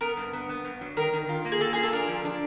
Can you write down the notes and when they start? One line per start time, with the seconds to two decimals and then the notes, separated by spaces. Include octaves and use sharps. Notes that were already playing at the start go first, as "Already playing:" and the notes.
0.01 B3 A#4
0.17 G2
0.33 B3
0.49 B3
0.64 G2
0.81 F#3
0.97 D#3 A#4
1.13 D#3
1.29 F4
1.45 A#3
1.52 G#4
1.61 A#3 A4
1.73 F4 G#4
1.83 A4
1.93 D4 A#4
2.09 F3
2.25 D4